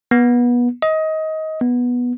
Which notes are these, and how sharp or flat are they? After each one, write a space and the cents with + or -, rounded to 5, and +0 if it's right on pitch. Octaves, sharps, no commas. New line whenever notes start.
B3 -25
D#5 +20
B3 -10